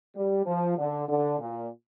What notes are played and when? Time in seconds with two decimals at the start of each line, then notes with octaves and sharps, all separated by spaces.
0.16 G3
0.46 F3
0.78 D3
1.08 D3
1.39 A#2